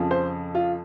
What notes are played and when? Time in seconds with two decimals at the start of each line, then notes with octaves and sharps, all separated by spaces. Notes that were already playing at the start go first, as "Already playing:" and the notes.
Already playing: F2 C#3 F3
0.11 C5
0.55 F4